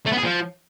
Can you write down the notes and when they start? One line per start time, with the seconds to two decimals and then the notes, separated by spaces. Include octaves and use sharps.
0.06 A3
0.12 B3
0.17 G#4
0.23 F3